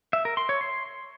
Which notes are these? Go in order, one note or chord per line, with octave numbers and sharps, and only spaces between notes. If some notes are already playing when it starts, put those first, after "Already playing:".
E5
A#4
C6
C#5
C6